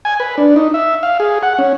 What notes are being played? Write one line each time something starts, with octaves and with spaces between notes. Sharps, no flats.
G#5
B4
D4
D#4
E5
F5
G#4
F#5
C#4